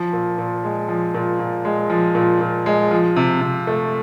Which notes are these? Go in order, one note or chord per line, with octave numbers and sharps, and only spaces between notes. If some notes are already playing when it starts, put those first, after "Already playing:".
Already playing: F3
A#2
A#2
G#3
F3
A#2
A#2
G#3
F3
A#2
A#2
G#3
F3
C3
C3
A3